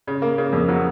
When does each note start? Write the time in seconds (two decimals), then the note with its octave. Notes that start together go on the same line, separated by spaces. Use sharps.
0.07 C#3
0.22 A#3
0.38 C#3
0.53 F2
0.69 F#3